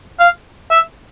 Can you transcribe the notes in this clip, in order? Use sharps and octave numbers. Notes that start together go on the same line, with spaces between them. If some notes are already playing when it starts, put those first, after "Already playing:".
F5
E5